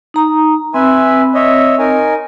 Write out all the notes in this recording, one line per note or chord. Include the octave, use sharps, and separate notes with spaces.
D#4 A#5 D#6
C4 B4 E5 G#5
C#5 D#5 E5
D#4 A#4 G#5